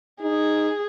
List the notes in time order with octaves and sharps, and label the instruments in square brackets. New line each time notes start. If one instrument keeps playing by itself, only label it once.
[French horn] D#4 [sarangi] G#4